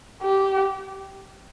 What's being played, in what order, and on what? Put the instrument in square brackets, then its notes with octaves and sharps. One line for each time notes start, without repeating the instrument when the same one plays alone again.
[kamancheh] G4